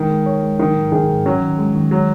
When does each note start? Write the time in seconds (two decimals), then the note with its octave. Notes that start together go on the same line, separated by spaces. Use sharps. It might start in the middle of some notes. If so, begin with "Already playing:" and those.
Already playing: D#3 G#3
0.11 G#3
0.26 C#5
0.43 G#3
0.59 D#3 F#3
0.76 G#2
0.92 D#3 G#4
1.09 G#2
1.26 F#3 C#4
1.42 D#3
1.59 G#3
1.75 D#3
1.91 F#3 G#3